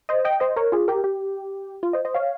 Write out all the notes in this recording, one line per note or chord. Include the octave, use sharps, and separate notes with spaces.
C5 D#5
D#5 G5
C5 D#5
A#4 C#5
F4 G#4
G4 A#4
G4
F4
C5 D#5
C5 D#5
C#5 F5